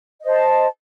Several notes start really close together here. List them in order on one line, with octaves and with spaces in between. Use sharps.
D#5 C5 A5